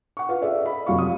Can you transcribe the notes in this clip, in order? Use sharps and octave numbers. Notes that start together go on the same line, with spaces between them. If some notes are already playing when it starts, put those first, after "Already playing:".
F#5 C#6
F4 B4 F5 F#5
G#4 A4 D5 E5
D#5 B5
F1 F#3 F4 F5 C#6
D#6